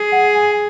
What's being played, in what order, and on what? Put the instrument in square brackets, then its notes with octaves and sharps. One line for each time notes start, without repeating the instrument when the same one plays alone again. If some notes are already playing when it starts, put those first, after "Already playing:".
Already playing: [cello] G#4
[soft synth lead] F#5
G#5